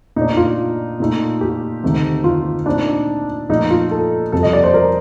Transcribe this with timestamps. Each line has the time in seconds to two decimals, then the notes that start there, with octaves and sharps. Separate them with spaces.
0.16 A#2 A3 D4 D#4
0.37 F4
1.00 A#2 A3 D#4
1.41 G4
1.83 D2 C3 D#3 A3 D#4
2.24 F4
2.66 A#2 A3 C4 D4 D#4
3.49 A#2 F3 A3 D#4
3.70 F4
3.91 A4
4.32 F2 C3 G3 A4
4.43 D#5
4.53 D5
4.64 C5
4.74 A#4